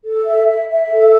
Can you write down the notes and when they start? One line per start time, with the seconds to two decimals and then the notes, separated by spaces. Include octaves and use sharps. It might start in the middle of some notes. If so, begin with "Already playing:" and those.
0.05 A4
0.26 E5
0.47 E5
0.68 E5
0.89 A4